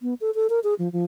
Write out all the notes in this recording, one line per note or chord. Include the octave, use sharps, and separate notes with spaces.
B3
A4
A4
A#4
G#4
F3
F3